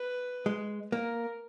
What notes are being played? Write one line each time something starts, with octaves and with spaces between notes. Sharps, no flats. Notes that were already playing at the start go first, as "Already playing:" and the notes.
Already playing: B4
G#3
A#3 A#4